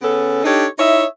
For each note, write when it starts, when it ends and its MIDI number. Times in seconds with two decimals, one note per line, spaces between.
0.02 0.43 49
0.02 0.43 59
0.02 0.43 61
0.02 0.43 69
0.44 0.67 62
0.44 0.67 63
0.44 0.67 67
0.44 0.67 69
0.44 0.67 73
0.78 1.04 63
0.78 1.04 64
0.78 1.04 73
0.78 1.04 75
0.78 1.04 76